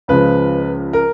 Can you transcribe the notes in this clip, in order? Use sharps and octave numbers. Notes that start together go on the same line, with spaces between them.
C#2 C#3 F3 G#3 B4
A#4